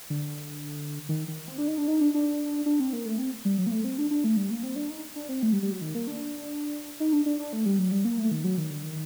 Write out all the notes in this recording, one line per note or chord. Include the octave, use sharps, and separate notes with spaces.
D3
D#3
D#3
C4
D4
D#4
D4
D#4
D4
D4
D4
C4
A#3
A3
C4
G3
F#3
A#3
A3
C4
D4
D4
A3
G3
A#3
C4
D4
D#4
D4
C4
A3
G3
G3
F#3
D#3
A#3
D4
D#4
D4
D4
D4
A3
G3
F#3
G3
A#3
A3
D#3
F#3
D#3
D3
D#3